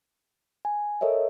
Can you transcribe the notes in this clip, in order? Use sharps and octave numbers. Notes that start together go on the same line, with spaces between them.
G#5
A4 A#4 C#5 D#5 E5